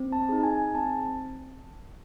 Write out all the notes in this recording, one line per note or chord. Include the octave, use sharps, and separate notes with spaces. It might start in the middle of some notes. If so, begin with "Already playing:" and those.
Already playing: C4
A5
D#4 G#4
G#5
C4 A5